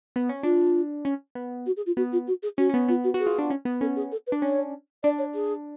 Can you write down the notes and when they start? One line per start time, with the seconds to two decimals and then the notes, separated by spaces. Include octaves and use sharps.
0.16 B3
0.29 C#4
0.43 D4 F4
1.05 C#4
1.35 B3
1.66 F#4
1.77 G#4
1.86 F4
1.97 B3 F#4
2.12 F4
2.27 F#4
2.43 G#4
2.58 C#4 F#4
2.69 C#4
2.74 B3
2.89 B3 F4
3.04 F#4
3.14 F#4
3.19 G#4
3.26 F4
3.39 D4
3.50 C#4
3.65 B3
3.81 C#4 A4
3.96 G#4
4.12 A4
4.27 B4
4.32 D4
4.42 C#4 C#5
5.03 D4 D5
5.18 C#5
5.35 G#4